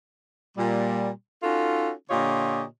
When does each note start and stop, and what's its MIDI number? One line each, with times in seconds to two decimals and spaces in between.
0.58 1.10 46
0.58 1.10 55
1.43 1.91 61
1.43 1.91 63
1.43 1.91 65
1.43 1.91 66
1.43 1.91 69
2.10 2.63 46
2.10 2.63 50
2.10 2.63 65
2.10 2.63 67
2.10 2.63 73
2.10 2.63 75